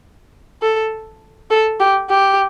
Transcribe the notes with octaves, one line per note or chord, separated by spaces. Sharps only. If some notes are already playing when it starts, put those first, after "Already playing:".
A4
A4
G4
G4